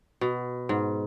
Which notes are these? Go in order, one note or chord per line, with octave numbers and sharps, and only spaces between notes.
B2
G#2